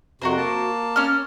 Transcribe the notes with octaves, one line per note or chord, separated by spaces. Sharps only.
F2 C3 F#4 A#4 C5
A#3 A5
C#4 D6 F6